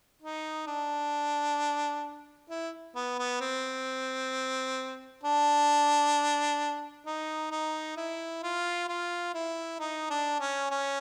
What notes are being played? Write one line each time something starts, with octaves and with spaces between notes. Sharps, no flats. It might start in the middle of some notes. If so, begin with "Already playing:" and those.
D#4
D4
E4
B3
B3
C4
D4
D#4
D#4
E4
F4
F4
E4
D#4
D4
C#4
C#4